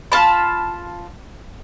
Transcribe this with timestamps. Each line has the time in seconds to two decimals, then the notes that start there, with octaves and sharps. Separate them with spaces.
0.12 F4 A5 B5